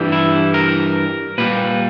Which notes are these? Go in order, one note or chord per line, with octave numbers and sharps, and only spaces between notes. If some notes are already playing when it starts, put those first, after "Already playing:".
Already playing: G2 E3 G3
E4
A#4
A#2 G3 B4